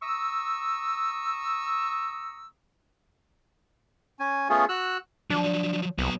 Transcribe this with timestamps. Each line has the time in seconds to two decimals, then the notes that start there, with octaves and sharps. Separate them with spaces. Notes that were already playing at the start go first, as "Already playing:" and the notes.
0.03 A#5 C#6 D#6 E6
4.19 C#4 G#5
4.49 A3 B3 C#4 F4 G#4
4.69 F#4 E6 F#6
5.30 F3 F#3 D4
5.98 C2 F#3 B3